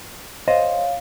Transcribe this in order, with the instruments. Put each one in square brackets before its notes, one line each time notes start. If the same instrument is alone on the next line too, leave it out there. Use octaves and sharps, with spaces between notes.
[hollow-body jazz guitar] C5 D#5 [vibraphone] C#5 F5